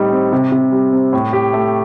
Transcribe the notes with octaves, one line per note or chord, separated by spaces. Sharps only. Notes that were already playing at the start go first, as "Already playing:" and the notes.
Already playing: A2 G3 C4 D#4
C4
C3
C3
G3
C4
A2
G4
A3